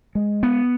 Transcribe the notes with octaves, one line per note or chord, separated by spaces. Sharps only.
G#3
B3